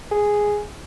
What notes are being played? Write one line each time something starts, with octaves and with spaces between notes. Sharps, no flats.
G#4